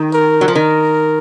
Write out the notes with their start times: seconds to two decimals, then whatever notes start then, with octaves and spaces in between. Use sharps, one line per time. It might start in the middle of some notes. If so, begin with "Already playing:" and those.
Already playing: D#3
0.13 A#4
0.41 F#3
0.48 F3
0.55 D#3 A#4